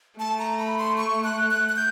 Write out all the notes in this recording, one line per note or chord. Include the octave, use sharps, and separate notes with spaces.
A3 A5
A#5
B5
C6
C#6
F#6
F#6
F#6
G6